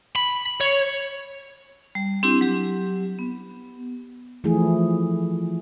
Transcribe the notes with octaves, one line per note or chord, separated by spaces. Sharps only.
B5
C#5
G3
C4 D4 E4 G4
F#3 G4
B3
E3 F3 A3 E4 G#4